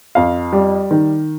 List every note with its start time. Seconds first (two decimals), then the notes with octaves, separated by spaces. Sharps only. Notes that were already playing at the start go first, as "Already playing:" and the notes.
0.15 F2 F5
0.53 G3
0.91 D#3